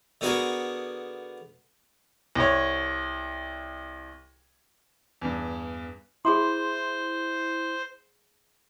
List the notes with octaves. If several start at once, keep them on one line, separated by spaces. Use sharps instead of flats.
D3 B3 F#4 G#4 A#4
C2 C#5
E2 G2
E4 G#4 C5 B5 C6